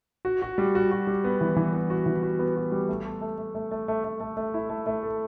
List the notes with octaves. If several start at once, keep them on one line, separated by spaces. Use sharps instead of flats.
F#4
F#4
G3
F#4
F#4
G3
B3
E3
E3
B3
F#4
E3
F#4
B3
F#4
G3
A3
A4
A3
A3
A3
A3
A3
A3
A3
A3
E4
A3
A3
A4